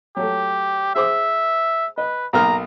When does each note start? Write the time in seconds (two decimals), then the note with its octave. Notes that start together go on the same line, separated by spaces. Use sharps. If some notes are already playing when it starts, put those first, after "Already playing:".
0.16 F#3 A3 G4
0.96 G#4 C5 E5 D6
1.98 B4 D#5
2.33 B1 A#3 A#5 F6